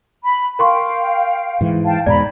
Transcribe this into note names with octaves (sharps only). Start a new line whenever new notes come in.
B5
A#4 F5 G5 C6 C#6
G#2 E3
F5 G5 A5
E2 G#2 B2 D5 A#5 B5